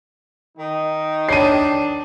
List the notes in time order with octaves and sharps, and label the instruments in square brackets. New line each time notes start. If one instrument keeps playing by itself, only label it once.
[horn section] D#3 D#4
[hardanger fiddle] D4 [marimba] C#5 [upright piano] C7 D#7